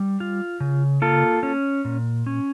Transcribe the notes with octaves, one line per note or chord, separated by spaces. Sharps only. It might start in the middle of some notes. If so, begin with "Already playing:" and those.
Already playing: G3
F4
C#3
A#3 F4 A4
C#4
A#2
C#4